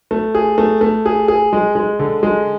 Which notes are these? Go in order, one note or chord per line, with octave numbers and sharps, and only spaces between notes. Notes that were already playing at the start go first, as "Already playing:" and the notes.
A3
G#4
A3
A3
G#4
G#4
G#3
G#3
D3
G#3